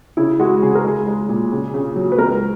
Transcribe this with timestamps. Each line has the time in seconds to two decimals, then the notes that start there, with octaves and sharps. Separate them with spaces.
0.17 C#3 E4
0.39 G#3 F#4
0.62 C#3 G#4
0.75 A#4
0.85 G#3 G#4
1.07 G#3
1.29 A#2
1.52 C#3
1.74 C#3
1.96 F#3
2.12 B4
2.18 C#2 A#4